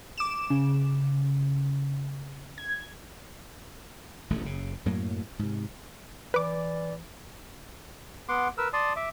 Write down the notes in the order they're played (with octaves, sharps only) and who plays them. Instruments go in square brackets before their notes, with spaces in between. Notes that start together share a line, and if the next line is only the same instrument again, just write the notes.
[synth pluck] D6 E7
C#3
G#6
[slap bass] D#1 A1 D2 A3
F#1 C#3
F#2 A2 F#3 A#3
G#2 C3
[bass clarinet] E3 [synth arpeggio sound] B4 D6 [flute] D5
[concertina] B3 F#5 C6 D6
A#4 B4 E6
D5 A5 C6 D#6
E5 D6